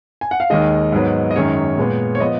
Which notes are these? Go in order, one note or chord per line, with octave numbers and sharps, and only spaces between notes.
G#5
F#5
F5
D#2 D#3 G#3 D#5
G#2 F#3 B3
D#5
F#2 D#3 G#3 C#4 C#5
A#2 G#3 B3
C#5
F3 B3 D#5